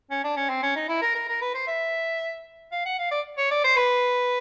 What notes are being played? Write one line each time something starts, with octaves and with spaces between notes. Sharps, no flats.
C#4
D4
C#4
C4
C#4
D#4
E4
A#4
A#4
A#4
B4
C5
E5
F5
F#5
F5
D5
C#5
D5
C5
B4